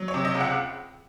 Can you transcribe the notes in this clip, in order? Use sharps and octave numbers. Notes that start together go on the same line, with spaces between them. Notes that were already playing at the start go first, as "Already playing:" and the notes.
Already playing: F#3
C#5
C3
D#5
C#2
F#5